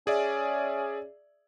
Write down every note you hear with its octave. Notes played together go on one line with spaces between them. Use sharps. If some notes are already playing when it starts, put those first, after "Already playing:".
C#4 G#4 D5 E5